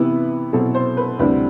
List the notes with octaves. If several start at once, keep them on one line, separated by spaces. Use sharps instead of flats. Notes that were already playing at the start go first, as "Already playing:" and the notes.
Already playing: C3 E3 B3 E4 B4
B2 F#3 C4 E4 A4
C5
B4
D2 C3 G3 C4 E4 B4